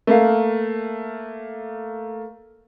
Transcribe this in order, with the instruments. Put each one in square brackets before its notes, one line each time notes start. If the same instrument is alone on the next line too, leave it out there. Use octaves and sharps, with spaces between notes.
[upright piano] A3 A#3 F5